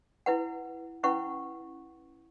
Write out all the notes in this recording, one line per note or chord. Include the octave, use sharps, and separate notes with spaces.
E4 B4 F#5
C#4 E4 B4 F#5 C#6